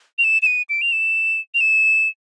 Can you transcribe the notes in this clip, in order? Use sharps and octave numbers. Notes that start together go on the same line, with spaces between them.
F7
E7
E7
D#7
D7
F7
E7
F7
E7